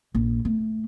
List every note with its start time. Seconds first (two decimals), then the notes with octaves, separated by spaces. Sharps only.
0.15 A#1
0.45 A3